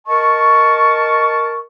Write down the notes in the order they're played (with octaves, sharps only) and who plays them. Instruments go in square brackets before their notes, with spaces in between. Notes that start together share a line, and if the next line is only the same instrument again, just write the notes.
[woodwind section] A#4 D#5 A5 C#6